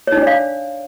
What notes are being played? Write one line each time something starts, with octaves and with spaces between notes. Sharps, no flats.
D4 D#4 C#5 D5 F5